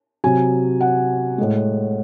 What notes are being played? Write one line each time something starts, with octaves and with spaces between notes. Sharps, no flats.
C3 F#3 G#5
F#5
A2 G#3